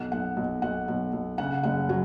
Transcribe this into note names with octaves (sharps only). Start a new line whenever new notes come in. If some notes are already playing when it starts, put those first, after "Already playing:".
Already playing: B1 F#5
B1 F#5
B1
B1 F#5
B1
B1
C#3 F#5
F#1 F#5
F#3